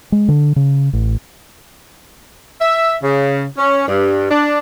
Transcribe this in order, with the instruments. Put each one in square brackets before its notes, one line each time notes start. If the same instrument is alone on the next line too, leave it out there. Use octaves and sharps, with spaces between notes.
[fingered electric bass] G#3
D3
C#3
A1
[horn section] E5
C#3
C#4
G2
D4